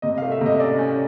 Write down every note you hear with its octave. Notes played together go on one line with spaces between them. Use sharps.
C3 D#5
F5
A3
E5
C3 D#5
C#4 D5
C#4